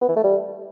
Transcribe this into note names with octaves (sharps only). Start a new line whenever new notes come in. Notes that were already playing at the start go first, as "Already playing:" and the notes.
B3
E3
A3
G3